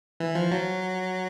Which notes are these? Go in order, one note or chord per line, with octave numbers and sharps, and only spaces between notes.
E3
F3
F#3